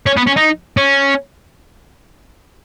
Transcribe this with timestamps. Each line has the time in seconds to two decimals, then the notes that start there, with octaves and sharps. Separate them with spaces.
0.06 C#4
0.17 B3
0.27 C#4
0.37 D#4
0.77 C#4